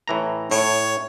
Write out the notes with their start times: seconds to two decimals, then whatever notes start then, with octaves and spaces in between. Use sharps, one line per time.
0.08 A2 E3 A#5
0.51 A2 C#5